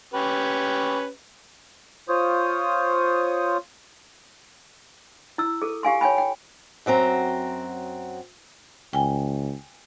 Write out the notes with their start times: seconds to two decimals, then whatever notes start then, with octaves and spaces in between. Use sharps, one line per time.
0.14 C#4 G4 B4
2.09 F4 C5 C#5 D#6
5.38 E4 E6
5.62 G#4 A4
5.83 G4 F5 G#5 C6
6.01 C#5 G5 G#5 B5
6.18 G5
6.86 F#2 F#3 C4 A#5
8.93 C#2 G5 G#5